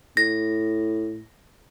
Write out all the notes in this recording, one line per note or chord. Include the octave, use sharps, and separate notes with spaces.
A2 A#6